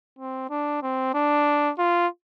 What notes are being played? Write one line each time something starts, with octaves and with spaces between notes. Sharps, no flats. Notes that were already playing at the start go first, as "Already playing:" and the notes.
C4
D4
C4
D4
F4